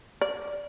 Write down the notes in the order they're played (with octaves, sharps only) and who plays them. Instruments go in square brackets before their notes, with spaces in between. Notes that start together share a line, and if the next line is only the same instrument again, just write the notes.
[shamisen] D5